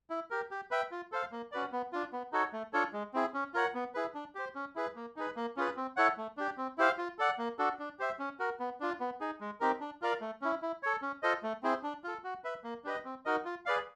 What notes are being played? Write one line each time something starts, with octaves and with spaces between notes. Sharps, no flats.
E4
G4 A#4
G4
B4 E5 G5
F4
A4 C5 F5
A#3
C#4 F#4 B4 D5
B3
D4 F4
B3
D#4 F#4 A4 C#5
A3
D4 F4 A4 C#5
G#3
C4 E4 G#4
C#4
F4 A#4 C#5 F#5
B3
E4 G#4 B4
D4
G4 C5
C#4
E4 G#4 B4
A#3
D#4 G#4 B4
A#3
C#4 F4 G#4 B4
C4
E4 A4 C#5 F#5
A3
D4 G4
C4
E4 G4 C5 F5
F4
A4 D5 F#5
A#3
D4 F#4 A4
D4
G4 C5 E5
C#4
F#4 A#4
B3
D4 F4
B3
D#4 G#4
G#3
C4 D#4 G4 A#4
D4
F4 A#4 D5 F5
A3
C#4 E4
E4
A4 C#5
C#4
F4 A4 C5 D#5
A3
C4 E4 G#4 C5
D4
F4 A4
F#4
B4 E5
A#3
D4 G4 B4 D#5
C4
D#4 F#4 A#4 D#5
F4
G#4 B4 D5 F5